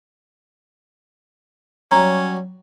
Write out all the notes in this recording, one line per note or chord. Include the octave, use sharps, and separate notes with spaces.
F#3 G3 C#4 A#5